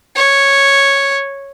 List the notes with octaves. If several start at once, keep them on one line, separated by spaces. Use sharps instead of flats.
C#5